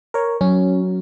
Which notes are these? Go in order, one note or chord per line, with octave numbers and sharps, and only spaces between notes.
A#4 C#5
F#3 C#4